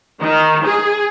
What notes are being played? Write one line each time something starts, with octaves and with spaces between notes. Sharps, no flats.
D#3
G#4